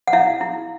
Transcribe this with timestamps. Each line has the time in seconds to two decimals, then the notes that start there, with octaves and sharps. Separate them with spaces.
0.07 F#5
0.13 E4 F5
0.41 E4